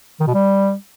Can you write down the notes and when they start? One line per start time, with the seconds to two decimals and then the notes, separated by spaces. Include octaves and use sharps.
0.20 D#3
0.27 B2
0.34 G3